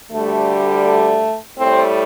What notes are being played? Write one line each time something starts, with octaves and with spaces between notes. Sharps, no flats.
D2 D3 G3 A3
A3
A2 G3 C4